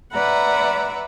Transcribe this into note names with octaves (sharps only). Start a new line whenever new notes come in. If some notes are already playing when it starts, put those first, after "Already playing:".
B4 D5 E5 F#5 A#5 B5